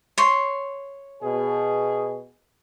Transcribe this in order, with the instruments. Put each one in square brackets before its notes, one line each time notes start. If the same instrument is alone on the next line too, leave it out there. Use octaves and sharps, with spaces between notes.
[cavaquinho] C#5 C6
[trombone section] B2 G#4